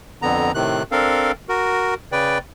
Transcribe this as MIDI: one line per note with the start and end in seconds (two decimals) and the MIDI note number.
0.22 0.52 41
0.22 0.52 50
0.22 0.52 59
0.22 0.52 82
0.55 0.83 45
0.55 0.83 48
0.55 0.83 51
0.55 0.83 90
0.91 1.32 60
0.91 1.32 62
0.91 1.32 69
0.91 1.32 70
0.91 1.32 77
1.49 1.94 66
1.49 1.94 70
2.12 2.38 49
2.12 2.38 71
2.12 2.38 74
2.12 2.38 79